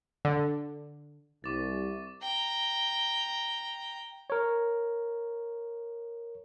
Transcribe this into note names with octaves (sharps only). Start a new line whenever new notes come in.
D3
C2 C#6 D6 A6
G5 A#5
A#4 C#5